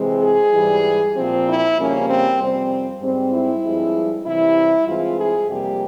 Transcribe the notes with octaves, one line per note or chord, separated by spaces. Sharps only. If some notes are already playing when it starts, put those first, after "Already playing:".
Already playing: C3 E3 G#3 C4
G#4
G#2 E3 G3
A#2 F3 C4
E4
F2 C#3 G3 A#3 C#4
C4
F2 C3 G3 C4
G#2 G3 C4
E4
G2 F3 G#3
C3 E3 G3 E4
G2 E3 G#3 C4 F4
G#4
F2 C3 G3 A#3 G4